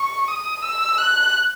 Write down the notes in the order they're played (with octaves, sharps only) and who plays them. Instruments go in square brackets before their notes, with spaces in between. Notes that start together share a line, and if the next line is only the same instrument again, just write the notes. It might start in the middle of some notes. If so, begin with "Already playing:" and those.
Already playing: [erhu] C#6
D#6
E6
F#6